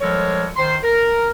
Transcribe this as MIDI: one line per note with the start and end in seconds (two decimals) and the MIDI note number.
0.01 0.47 53
0.01 0.47 55
0.01 0.47 56
0.01 0.47 69
0.01 0.47 70
0.01 0.47 73
0.56 0.75 51
0.56 0.75 72
0.56 0.75 84
0.84 1.30 70